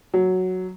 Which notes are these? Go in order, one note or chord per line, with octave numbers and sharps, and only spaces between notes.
F#3